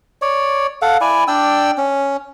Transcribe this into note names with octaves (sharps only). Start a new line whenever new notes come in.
C#5 D5
A4 F5 F#5
E4 D5 G#5
D4 D5 G5 E6
C#4